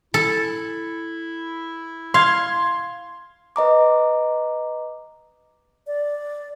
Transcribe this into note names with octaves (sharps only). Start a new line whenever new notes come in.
E4 A4
F5 C6 G#6
B4 D#5 A#5 D6
D5